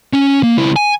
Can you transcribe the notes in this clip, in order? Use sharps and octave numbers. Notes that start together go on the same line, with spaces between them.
C#4
A#3
C#2 E4
G#5